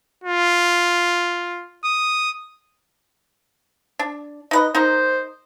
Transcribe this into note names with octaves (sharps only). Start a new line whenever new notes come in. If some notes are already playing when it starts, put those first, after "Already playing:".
F4
D#6
D4
D#4 B4 D#5
D#4 A#4 C5 D#5